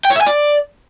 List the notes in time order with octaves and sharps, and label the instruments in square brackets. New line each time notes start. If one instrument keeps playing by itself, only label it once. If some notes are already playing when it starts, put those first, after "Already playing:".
[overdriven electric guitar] G5
C#5
E5
G#5
D5